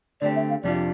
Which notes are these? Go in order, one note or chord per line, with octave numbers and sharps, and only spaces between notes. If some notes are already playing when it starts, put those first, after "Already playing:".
D3 A3 C4 G4 D5
E5
F5
F2 C3 G3 D4 F4 D5